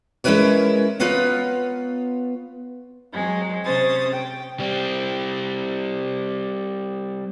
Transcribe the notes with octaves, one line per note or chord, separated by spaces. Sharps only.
G#3 C#4 E4 A#4 B4 C#5
B3 F4 B4 C#5 F5 A#5
F#3 G#3 C4
C3 C#4 C5 D#6 A6
G5
G3 C4